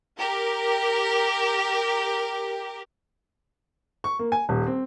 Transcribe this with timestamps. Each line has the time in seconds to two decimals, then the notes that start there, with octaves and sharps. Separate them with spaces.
0.19 G4 A#4
4.04 C#6
4.19 A#3
4.32 G#5
4.49 D#1
4.67 C4